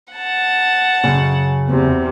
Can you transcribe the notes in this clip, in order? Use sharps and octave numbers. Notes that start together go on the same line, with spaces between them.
F#5 A5
F#2 C#3
E2 C3